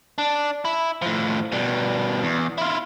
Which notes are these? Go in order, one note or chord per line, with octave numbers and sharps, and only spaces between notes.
D4
E4
A2 F3
B2 G3
E2
E4 F4